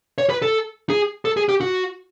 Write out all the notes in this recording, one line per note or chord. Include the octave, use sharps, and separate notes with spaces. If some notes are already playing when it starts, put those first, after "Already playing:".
C#5
B4
A4
G#4
A4
G#4
G4
F#4